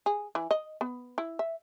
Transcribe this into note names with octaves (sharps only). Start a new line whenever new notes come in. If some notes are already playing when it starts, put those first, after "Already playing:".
G#4
E3
D#5
B3
E4
E5